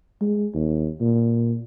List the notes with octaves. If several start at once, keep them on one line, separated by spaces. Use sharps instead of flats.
G#3
D#2
A#2